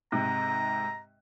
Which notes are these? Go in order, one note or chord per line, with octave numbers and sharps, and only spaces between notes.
G#2 C3 A#5